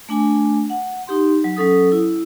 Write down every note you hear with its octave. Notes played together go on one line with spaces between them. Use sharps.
A3 D4 G#5
F#5
D#4 G4 C6
F#3
F#3 C#4 A4 D#6
E4